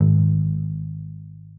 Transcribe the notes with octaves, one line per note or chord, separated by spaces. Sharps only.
G#1